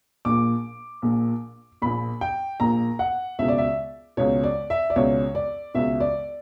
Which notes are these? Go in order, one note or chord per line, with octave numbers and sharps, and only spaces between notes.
A#1 A#2 D6
A#1 A#2
A#1 A#2 B5
G5
A#1 A#2 A#5
F#5
C#2 B2 E5
D5
E5
C#2 B2 C#5
D5
E5
D5
C#2 B2 C#5
D5
C#2 B2 E5
D5